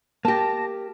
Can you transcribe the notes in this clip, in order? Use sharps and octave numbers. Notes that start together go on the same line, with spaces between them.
A#3 G4 A5 A#6